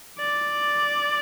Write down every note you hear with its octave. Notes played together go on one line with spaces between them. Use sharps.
D5